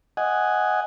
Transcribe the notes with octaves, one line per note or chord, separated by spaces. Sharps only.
D#5 F#5 G#5